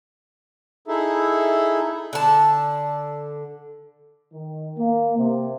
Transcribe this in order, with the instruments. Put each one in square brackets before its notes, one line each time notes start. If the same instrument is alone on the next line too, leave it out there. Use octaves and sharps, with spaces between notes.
[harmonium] D#4 E4 G#4 A4 E5
[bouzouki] D3 A5
[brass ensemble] D#3
A#3
C3